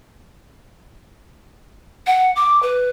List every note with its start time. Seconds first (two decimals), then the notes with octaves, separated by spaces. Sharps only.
2.07 F#5
2.36 D6
2.63 B4